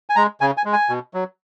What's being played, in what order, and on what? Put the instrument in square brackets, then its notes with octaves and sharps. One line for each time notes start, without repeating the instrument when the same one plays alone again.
[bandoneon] G#5
G#3 A#5
C#3 G#5
G#5
G#3
G#5
B2
F#3